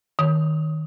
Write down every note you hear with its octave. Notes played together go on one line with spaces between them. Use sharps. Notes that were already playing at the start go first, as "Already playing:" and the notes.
D#3